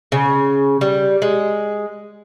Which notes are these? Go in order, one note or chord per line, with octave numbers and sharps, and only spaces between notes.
C#3
G3
G#3